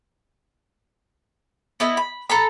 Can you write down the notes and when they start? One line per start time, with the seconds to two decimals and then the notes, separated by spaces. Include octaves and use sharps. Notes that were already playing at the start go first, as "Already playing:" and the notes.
1.80 B3 E4 D#5
1.97 B5
2.30 A4 A#5 B5